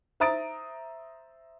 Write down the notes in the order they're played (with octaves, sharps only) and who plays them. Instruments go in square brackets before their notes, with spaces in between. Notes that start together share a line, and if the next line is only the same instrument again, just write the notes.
[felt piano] C5 E5 A#5 D#6 A6 D7